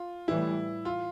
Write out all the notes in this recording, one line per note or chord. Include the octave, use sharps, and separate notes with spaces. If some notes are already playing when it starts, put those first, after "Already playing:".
Already playing: F4
A2 E3 G3 E4
F4